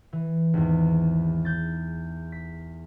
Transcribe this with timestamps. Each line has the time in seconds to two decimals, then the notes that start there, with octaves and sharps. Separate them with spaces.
0.13 E3
0.54 G#1 E2
1.45 G6 A6
2.32 B6